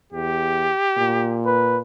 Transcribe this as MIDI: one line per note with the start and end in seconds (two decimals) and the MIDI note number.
0.13 0.71 40
0.13 1.42 67
0.97 1.81 46
1.46 1.79 71